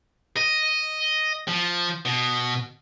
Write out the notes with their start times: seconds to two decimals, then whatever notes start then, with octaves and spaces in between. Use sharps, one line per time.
0.37 D#5
1.48 F3
2.05 B2